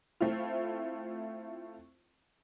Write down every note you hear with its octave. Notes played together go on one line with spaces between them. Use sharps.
A3 C4 E4 F4